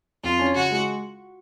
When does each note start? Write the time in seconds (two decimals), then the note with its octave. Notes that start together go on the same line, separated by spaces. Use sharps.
0.24 F2 F4
0.39 C#4
0.55 C#3 F#4
0.71 G#3